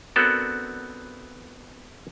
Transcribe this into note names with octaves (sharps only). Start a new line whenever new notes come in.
B3 C4 D4 F#4 A4 A#4